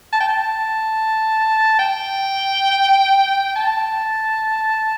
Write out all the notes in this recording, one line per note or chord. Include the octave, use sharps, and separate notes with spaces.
A5
G5
A5
G5
A5